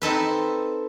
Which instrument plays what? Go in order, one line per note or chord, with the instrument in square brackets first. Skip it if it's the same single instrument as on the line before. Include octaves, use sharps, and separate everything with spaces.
[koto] C4 D#4 A4 B4